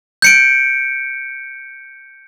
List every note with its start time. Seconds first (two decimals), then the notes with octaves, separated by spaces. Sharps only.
0.22 G6 C#7 D7